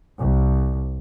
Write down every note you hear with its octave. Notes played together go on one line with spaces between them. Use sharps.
C2